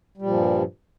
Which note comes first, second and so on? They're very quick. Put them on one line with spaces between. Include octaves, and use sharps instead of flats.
G3 A#2 F3 G2